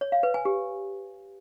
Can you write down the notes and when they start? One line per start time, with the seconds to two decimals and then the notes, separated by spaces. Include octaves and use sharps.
0.01 C#5
0.12 F5
0.23 B4
0.34 G#5
0.45 G4